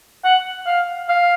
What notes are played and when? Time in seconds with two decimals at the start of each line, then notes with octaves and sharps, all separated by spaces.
0.25 F#5
0.67 F5
1.09 F5